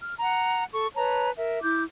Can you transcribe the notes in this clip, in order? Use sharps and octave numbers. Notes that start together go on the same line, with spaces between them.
F6
F#5 A#5
A4 C#6
B4 C#5 A5 A#5
A#4 E5
E4 D6 G6